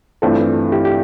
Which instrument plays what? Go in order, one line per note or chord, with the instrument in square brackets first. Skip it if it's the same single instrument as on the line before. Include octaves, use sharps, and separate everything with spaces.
[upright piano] G2 E3 A3 C4 [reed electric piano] F4 A4
[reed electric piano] E4 G4
G4